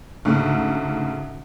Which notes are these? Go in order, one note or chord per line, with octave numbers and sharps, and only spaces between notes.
D2 G#2 C#3